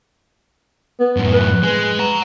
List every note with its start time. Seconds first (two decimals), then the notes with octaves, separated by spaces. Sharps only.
1.00 B3
1.17 F#2 A2
1.33 B4
1.63 G#3
1.99 F#5 A#5